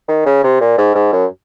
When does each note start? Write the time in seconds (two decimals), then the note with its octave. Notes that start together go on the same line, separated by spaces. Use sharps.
0.08 D#3
0.26 C#3
0.44 C3
0.61 A#2
0.78 G#2
0.95 G#2
1.13 F#2